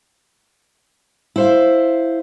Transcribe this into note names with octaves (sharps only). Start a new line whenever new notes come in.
E4 C5 F5